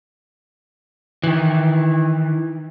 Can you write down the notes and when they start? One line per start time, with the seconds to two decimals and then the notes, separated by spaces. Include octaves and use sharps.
1.24 D#3 E3